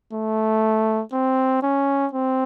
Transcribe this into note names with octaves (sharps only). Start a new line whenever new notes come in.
A3
C4
C#4
C4